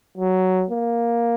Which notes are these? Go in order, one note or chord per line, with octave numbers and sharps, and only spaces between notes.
F#3
A#3